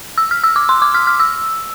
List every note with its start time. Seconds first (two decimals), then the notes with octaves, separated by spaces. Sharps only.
0.18 E6
0.31 F6
0.44 E6
0.56 D6
0.69 C6
0.82 D6
0.94 F6
1.07 F6
1.20 E6